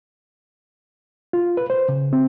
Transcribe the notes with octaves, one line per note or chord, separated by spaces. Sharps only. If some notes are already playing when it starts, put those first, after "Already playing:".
F4
B4
C5
C#3
C4